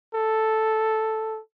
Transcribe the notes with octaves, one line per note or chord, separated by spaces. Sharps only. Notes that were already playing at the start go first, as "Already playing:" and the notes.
A4